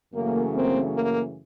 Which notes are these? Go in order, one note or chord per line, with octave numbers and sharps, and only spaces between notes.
F#2 C#3 E3 A3 A#3
A#3 C4
A#3